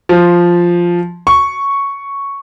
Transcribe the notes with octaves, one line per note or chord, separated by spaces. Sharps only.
F3
C#6